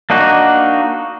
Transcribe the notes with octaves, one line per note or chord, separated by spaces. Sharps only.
A#3 D4 D#4 F#4